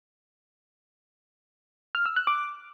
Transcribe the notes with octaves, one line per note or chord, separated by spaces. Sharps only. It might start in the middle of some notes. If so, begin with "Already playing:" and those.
F6
E6
F#6
D6